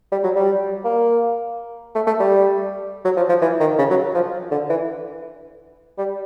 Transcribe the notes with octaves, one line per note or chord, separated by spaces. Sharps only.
G3
F#3
G3
A#3
A3
A3
G3
F#3
F3
F3
E3
D#3
C#3
F#3
F3
D3
E3
G3